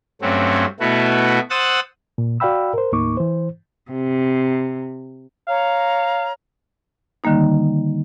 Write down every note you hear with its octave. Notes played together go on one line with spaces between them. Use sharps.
G2 F#3 A3 C4 C#4
B2 A3 B3 E4 F#4
C5 F#5 D#6 E6 F#6 A6
A#2
F#4 D5 F5 G5 B5 E6
A#4 C5
D#2 A2 A#3 D#4 C#6 D6
E3 C5
C3
C#5 F5 A#5
D3 D#3 G3 A#3 D#4